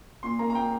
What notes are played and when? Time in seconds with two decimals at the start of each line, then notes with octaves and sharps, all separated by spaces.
0.23 A#2 C6
0.39 A#3 A#5
0.50 A#5
0.55 A#2 G5